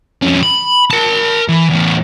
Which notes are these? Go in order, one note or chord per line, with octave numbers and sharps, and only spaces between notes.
F2 C#4
B5
A#4 A5
E3
E2 A2